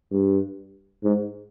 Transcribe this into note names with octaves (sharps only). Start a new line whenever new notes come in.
G2
G#2